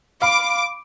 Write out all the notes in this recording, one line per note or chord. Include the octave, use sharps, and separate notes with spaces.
F5 B5 D6